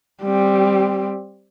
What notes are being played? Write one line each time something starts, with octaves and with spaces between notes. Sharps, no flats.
G3 C4